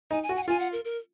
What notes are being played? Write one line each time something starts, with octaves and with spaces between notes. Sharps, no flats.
D#4 G#5
G#5
F#4
G#5
F#5
F4 G#5
F#5
A#4
A#4